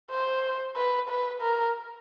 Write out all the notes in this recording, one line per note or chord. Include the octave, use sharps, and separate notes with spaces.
C5
B4
B4
A#4